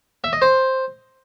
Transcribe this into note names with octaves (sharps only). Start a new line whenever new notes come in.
E5
D#5
C5